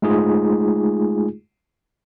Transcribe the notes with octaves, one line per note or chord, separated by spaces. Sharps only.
G#3 A3 D#4 F4 G#4